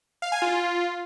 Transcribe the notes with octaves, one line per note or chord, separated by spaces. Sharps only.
F5
G#5
F4